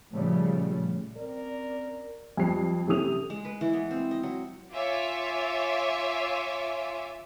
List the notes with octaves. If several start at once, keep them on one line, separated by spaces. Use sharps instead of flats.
A#2 C#3 F3 G3 A3 B3
C4 C#4 A#4 D5
F2 G3 C7
C3 E3 A3 C#4 D#6 F7
G#3
B4
E3
B3
C4
D#5
F#3
F4 C#5 E5 G#5 D6